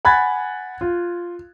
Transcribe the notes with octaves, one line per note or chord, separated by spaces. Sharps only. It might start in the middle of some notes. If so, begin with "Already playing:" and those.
F#5 G#5 B5 F#6 G#6 A6
F4